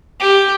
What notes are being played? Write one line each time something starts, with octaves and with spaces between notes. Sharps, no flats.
G4